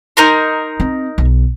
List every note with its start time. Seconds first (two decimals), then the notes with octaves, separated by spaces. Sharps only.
0.17 D#4 A#4 C6
0.80 C4
1.18 B1